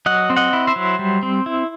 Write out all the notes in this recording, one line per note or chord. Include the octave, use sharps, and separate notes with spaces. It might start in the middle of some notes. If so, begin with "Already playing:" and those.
F#3 D#5 F#5
C4
D#5 F#5
E4
C5 E5
F#3
G3
C4
E4